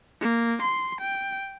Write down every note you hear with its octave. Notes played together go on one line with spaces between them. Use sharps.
A#3
C6
G5